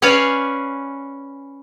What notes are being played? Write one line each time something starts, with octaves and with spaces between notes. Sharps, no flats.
C#4 B4 C#5 D5 F5 G#5